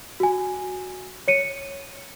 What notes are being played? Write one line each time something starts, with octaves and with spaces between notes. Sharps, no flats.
F#4 G#5
C#5 C#7 D#7